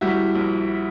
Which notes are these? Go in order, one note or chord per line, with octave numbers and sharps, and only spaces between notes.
G3 E4 F#4
A#1